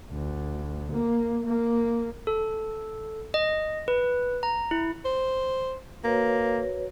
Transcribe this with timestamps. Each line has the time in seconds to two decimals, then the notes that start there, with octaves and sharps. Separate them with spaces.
0.11 D2
0.92 A#3
1.46 A#3
2.27 A4
3.34 D#5
3.88 B4
4.43 A#5
4.71 E4
5.05 C5
6.04 A#3 F#4 B4 C#5